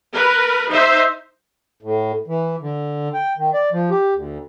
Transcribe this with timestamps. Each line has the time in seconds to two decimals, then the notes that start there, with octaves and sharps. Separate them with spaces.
0.13 A#4 B4
0.69 D#4 C5 E5
1.83 A2
2.27 E3
2.61 D3
3.14 G5
3.37 D#3
3.54 D5
3.72 F3
3.91 G4
4.14 D2